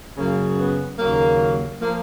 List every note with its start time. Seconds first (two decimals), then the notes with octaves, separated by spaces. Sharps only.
0.16 F#2 C#3 F#3 A#3
0.57 B3
0.98 D#2 C#3 F#3 A#3
1.81 F3 A#3